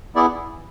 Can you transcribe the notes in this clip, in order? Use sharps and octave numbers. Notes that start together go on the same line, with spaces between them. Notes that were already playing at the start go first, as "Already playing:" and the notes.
B3 E4 G#4 D5